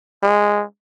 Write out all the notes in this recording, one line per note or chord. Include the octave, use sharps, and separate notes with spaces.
G#3